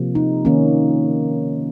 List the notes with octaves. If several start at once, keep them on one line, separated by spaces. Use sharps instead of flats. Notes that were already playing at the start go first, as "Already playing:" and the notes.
Already playing: C3 F3 A#3
D#4
D#3 A#3 C#4